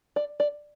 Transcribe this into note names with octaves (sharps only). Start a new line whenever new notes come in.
D5
D5